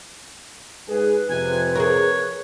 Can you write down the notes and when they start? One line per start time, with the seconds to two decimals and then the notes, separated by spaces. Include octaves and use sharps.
0.88 G#2 G#4 B4
1.30 F2 C3 G#5
1.76 G#4 A#4 C#5